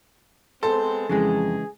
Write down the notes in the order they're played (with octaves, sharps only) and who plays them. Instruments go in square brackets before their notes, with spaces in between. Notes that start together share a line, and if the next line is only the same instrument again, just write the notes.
[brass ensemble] G#3 B3 C4 [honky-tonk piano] A4 [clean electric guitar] C5
[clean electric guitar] F2 [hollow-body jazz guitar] C#3 E3 G#3 [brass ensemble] G#4